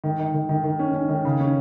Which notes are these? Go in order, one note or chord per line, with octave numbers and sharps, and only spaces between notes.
D#3
D#3
D#3
D#3
D#3
C#4
C#4
D#3
C#3
C#4